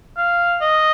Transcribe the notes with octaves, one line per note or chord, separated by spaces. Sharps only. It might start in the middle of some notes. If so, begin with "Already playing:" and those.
F5
D#5